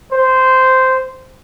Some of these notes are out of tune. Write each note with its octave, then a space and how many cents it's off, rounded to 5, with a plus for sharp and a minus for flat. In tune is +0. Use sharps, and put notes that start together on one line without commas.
C5 -10